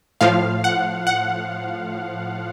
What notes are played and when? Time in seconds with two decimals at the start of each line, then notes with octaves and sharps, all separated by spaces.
0.21 A2 F3 F5
0.64 F#5
1.07 F#5